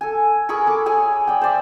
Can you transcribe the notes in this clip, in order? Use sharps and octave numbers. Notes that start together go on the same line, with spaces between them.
A4 G#5
G#4 A#4 B5 C#6
A4 D6
G#4 C#5 G#5
D5 G5
C5 D5 E5